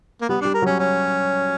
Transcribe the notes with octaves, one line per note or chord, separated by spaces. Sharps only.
A#3
G3 B3
G3 D4
A#4
F#3 C#4
C#4